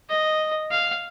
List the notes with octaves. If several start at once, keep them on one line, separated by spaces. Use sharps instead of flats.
D#5
F5